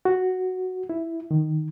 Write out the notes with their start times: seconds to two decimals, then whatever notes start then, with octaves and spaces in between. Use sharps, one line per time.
0.05 F#4
0.90 E4
1.31 D#3